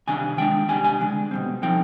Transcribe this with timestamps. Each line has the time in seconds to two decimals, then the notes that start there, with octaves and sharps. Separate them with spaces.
0.07 C3 D#3 G3 D4 G#5
0.38 D#3 G#3 D4 G5
0.69 C3 G3 D4 G#5
0.84 G#5
1.01 D3 G#3 D4
1.31 B2 G3 C4
1.62 D3 F3 C4 D#4 G5